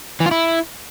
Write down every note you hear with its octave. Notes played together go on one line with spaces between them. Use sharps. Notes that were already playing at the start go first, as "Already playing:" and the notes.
E3
F4
E4